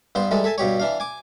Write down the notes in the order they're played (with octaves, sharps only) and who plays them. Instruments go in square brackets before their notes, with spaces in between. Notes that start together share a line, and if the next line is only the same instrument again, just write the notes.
[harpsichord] G2 B3 C5 C6
E3 G3 G#3 A4
A4 E5 G#5 A5
G2 B2 G4 C#5
E3 D4 F5
G#5 D6